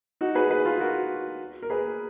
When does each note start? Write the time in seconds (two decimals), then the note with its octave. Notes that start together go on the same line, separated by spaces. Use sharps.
0.21 D#4 F#4
0.35 G#4 B4
0.50 G#4 B4
0.65 F4 G#4
0.80 F#4 A#4
1.62 A#4
1.70 G#4 B4